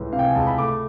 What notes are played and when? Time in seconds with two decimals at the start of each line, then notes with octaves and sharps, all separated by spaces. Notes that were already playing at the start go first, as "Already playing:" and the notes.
Already playing: C#2 A2 E3
0.13 C3 F5
0.19 G5
0.24 G#5
0.35 C#2 A5
0.47 B5
0.58 A3 D6